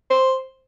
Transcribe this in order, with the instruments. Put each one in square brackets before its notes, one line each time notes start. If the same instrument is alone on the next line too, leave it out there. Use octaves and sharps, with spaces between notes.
[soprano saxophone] C5